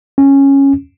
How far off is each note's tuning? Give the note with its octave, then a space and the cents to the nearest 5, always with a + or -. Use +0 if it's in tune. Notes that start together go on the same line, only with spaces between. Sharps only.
C#4 -10